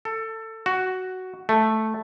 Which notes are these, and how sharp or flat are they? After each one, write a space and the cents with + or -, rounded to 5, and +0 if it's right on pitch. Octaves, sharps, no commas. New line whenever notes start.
A4 +20
F#4 +5
A3 -5